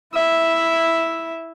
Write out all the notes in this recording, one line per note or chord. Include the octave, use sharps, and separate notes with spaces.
E4 E5